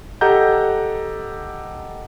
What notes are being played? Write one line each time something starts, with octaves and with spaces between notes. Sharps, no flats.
G4 A4 D#5 F#5 A#5 G6